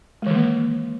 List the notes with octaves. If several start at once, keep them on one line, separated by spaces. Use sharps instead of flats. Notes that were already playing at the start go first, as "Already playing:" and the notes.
D#3 E3 G#3 A#3